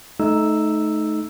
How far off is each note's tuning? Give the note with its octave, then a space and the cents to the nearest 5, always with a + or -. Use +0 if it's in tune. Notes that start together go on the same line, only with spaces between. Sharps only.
A3 -25 D#4 +0 E6 +0